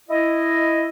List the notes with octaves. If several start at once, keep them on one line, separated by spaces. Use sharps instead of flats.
E4 D#5